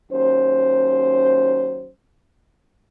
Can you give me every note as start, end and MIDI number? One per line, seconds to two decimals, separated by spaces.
0.11 1.90 39
0.11 1.90 54
0.11 1.90 61
0.11 1.90 72